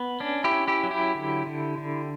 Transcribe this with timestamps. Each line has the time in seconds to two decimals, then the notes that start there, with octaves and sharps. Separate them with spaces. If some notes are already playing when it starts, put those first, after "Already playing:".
Already playing: B3
0.20 C#4 D4
0.44 E4 G4
0.52 C#4
0.68 E4 G4
0.83 F#3
0.91 E4 G4
1.15 D3
1.46 D3
1.78 D3